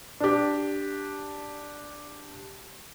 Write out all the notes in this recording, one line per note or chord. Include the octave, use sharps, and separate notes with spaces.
D4 G4